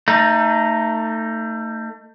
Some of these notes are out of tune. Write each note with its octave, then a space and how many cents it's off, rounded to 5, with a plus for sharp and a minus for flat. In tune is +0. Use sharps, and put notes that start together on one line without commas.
A3 +30 D#4 +0